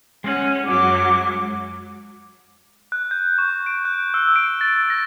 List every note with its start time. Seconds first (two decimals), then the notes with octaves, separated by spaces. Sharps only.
0.24 G#3 C#4 F#5
0.66 F#2 F#3 D6
2.92 F#6
3.11 G6
3.38 C#6
3.66 D7
3.85 F#6
4.14 E6
4.36 D7
4.61 A6
4.90 A#6